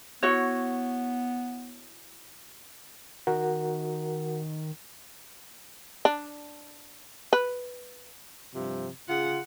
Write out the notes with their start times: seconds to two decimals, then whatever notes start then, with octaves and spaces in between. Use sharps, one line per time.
0.23 B3 E4 F#4 C#5
3.27 D#3 F#4 A#4 F#5
6.05 D4
7.33 B4
8.54 G2 C3 F3
9.09 C#3 F4 G#4 F#5